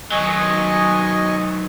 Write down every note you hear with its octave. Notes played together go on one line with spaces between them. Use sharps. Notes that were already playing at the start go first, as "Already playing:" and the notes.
D#3 F#3 D#5 G#5 C#6